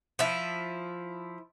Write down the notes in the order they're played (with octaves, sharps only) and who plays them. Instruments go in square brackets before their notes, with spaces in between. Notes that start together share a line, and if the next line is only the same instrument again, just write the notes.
[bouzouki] F3 E4